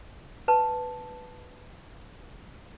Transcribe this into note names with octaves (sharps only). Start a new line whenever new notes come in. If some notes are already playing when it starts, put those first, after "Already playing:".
B4 A5